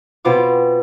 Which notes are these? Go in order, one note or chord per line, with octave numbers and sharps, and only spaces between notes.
B2 C4 F4 D6